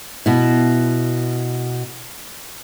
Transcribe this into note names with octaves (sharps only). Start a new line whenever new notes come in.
B2 E4